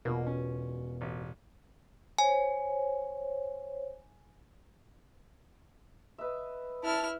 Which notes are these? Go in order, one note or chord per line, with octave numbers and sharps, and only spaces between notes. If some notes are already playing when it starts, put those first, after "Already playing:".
E1 B2 A#3 F4
C#4
A1
C5 C#5 G#5
B4 D#5 E5
E4 A5 F6